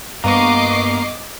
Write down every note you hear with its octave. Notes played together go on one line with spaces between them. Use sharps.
G2 A#3 B3 D#5 C#6 D6 C7